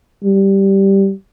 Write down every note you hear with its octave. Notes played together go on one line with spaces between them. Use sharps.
G3